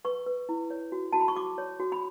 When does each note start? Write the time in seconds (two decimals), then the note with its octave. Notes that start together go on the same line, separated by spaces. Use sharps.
0.05 B4 C#6
0.26 B4
0.49 E4
0.70 C#5
0.92 F#4
1.12 F#4 A5
1.20 B5
1.28 C#6
1.35 F#4 D6
1.58 C#5
1.79 F#4
1.92 B5